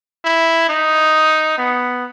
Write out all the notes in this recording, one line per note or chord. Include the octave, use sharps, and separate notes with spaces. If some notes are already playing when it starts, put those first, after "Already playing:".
E4
D#4
B3